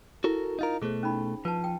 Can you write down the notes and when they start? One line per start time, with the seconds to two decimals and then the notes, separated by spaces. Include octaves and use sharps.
0.24 E4 F#4 A4 A#4
0.59 D#4 F4 A#4
0.82 B2 A3 G#4 C5
1.03 C#4 D#4 B5
1.45 F3 B4 A5
1.64 G5